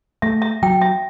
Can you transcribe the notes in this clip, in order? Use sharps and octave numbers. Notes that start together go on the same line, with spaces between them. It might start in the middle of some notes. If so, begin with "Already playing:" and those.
A3 E5
E5
F#3 G5
E5